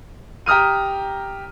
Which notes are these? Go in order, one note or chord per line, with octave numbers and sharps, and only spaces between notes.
G4 A#5 D#6 F6 D#7